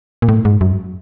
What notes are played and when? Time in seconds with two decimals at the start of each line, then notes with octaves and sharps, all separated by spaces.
0.22 A#2
0.28 A2
0.45 G#2
0.61 F#2